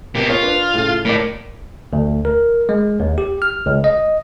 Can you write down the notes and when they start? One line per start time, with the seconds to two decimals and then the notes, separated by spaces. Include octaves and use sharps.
0.15 B2 A#3 G4
0.29 F4 C#5
0.43 D4 B4
0.73 A2 C#3
1.05 A2 A#3 D5
1.93 D2
2.25 A#4
2.69 G#3
3.00 D#2
3.18 G4
3.42 F6
3.66 C#2
3.84 D#5